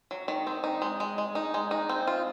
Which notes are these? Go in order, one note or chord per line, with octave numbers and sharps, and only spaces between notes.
F#3
D#3
C4
D#4
G#3
G#3
G#3
D#4
G#3
D#4
C4
F4